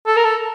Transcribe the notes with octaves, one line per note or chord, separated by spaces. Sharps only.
A4
A#4
A4